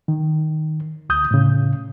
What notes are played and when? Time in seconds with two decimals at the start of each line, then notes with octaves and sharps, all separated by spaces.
0.08 D#3
1.09 D2 D#6 G6
1.31 A2 C#3